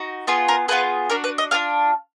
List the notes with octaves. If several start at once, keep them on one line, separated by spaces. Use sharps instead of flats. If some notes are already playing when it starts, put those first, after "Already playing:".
Already playing: D#4 F#4
B3 F4 G#4
A#4
B3 F4 G#4 B4
D4 F#4 A#4
B4
D#5
D4 F4 G#4 F5